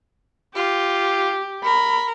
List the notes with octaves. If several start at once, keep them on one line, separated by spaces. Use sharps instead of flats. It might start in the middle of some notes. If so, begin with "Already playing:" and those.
F4 G4
A#4 B5